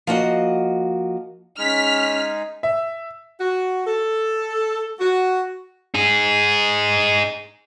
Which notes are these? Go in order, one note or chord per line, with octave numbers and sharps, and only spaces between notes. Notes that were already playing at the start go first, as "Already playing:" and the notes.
F3 A#3 F#4 D#5
G#3 C#4 D#4 G#4 F6 B6
E5
F#4
A4
F#4
D#4 G#4